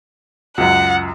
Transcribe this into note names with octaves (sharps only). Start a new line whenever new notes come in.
C#2 F#2 F#5